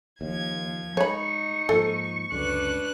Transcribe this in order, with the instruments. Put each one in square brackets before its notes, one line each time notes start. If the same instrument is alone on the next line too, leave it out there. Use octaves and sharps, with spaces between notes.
[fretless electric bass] D#2 [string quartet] F3 G#6
[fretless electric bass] G#3 [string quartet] D#4 [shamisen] C#5 B5 [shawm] C#6
[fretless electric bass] G#2 F3 A#3 [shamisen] A4
[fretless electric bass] C#2 F#2 D3 [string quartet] D4 B4 F#6